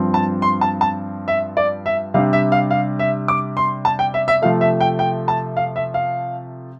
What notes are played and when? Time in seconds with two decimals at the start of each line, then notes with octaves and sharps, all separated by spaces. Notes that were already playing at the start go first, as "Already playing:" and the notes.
Already playing: G2 F3 C4
0.14 A5
0.42 C6
0.61 A5
0.81 A5
1.28 E5
1.57 D5
1.86 E5
2.14 C3 G3 D4 F5
2.33 E5
2.52 F5
2.71 F5
2.99 E5
3.28 D6
3.57 C6
3.85 A5
3.99 G5
4.14 E5
4.28 E5
4.42 C3 F3 A3 F5
4.61 E5
4.81 G5
4.99 G5
5.28 A5
5.57 F5
5.76 E5
5.94 F5